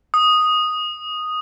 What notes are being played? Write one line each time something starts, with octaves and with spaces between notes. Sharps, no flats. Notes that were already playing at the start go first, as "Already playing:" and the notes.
D#6